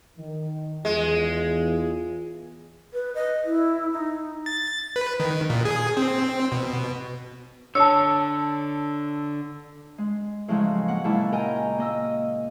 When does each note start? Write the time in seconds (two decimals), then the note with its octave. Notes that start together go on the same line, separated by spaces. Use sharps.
0.18 D#3
0.85 E2 G#3 F4
2.93 B4
3.15 D#5
3.44 E4
3.92 D#4
4.46 A6
4.96 B4
5.20 D#3
5.50 A#2
5.65 G#4
5.97 C4
6.52 B2
7.75 D3 C#5 A5 E6
9.98 G#3
10.48 A2 C#3 F3 F#3 G#3
10.88 A#3 F#5
11.04 A#2 C#3 G#3 E4 A5
11.32 A#4 D#5 G5 G#5 A#5
11.78 A#3 D#5 E6